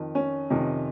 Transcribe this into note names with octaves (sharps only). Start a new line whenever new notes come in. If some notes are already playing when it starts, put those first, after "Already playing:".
Already playing: F2 D#3
C#4
F2 C3 D#3